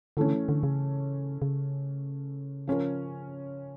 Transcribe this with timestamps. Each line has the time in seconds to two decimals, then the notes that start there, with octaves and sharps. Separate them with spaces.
0.17 D3 E3 A3 C#4
0.49 D3
0.63 C#3
1.42 C#3
2.67 F3 C#4 F4 A#4